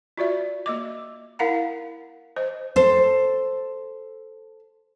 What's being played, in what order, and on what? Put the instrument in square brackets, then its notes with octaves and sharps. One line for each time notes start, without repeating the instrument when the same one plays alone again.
[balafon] F4 F#4 D5 E5
A#3 D#5 D6
E4 A#4 F5 F#5 A#5
C5 D#5
[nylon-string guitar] A4 C5